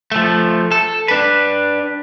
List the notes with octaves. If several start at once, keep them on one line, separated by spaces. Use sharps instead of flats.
F3 A3
A4
D4 B4